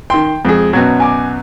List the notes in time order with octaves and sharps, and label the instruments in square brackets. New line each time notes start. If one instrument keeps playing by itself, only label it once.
[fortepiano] D#3 C6 [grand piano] G5
[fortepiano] F2 [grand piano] G#3 G#4
[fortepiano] F#2 B2 F#3 [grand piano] G#6
[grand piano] G#5 D6